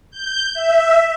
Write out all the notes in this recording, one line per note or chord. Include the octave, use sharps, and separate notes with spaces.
G6
E5